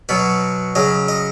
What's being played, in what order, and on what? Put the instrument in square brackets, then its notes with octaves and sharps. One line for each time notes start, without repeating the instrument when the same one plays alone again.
[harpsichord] B2 F#3 B4
C#3 F#3 D#5
D#5